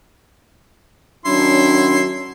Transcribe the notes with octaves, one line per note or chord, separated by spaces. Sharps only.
D#3 F#3 C#4 D4 E4 C6